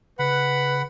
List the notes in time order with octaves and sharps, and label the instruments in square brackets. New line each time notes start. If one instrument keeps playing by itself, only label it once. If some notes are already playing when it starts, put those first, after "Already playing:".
[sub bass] C#3 [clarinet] B4 [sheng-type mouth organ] F#5 B5